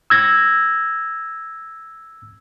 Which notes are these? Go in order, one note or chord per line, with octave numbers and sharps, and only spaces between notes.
E6 G#6 A#6